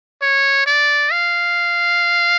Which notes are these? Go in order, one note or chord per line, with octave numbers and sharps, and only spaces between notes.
C#5
D5
F5